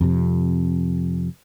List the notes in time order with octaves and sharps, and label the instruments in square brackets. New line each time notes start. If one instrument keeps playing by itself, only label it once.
[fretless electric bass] F2 C3